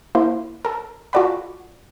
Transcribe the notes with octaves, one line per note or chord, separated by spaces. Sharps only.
A#3 E4 C5
A4 A#4
F4 F#4 A4 D5 F#5 B5